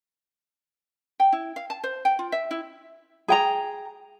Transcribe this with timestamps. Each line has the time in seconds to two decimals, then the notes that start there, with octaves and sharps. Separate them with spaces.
1.20 G5
1.32 E4
1.56 F5
1.70 A5
1.83 C5
2.05 G5
2.19 F4
2.32 E5
2.51 E4
3.28 G#4 G5 A#5